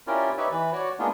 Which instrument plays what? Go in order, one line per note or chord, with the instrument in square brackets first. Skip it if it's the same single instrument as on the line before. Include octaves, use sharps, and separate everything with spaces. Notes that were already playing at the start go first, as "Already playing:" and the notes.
[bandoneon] C#4 E4 F4 G4 A#4 D5
D#4 G4 B4 C#5 D5 E5
E3 B4
F#4 C#5 D5
G#3 A#3 B3 D4 D#4 F4